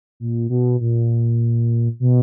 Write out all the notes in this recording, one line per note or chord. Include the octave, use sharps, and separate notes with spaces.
A#2
B2
A#2
B2